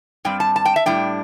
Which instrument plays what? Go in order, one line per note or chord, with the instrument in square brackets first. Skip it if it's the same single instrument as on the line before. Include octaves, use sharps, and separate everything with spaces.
[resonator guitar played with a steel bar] G2 G3 C4 G5
A5
A5
G5
E5
A2 G3 D4 G5